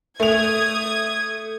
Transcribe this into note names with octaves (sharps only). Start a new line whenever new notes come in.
A3 D#6 G#6 F7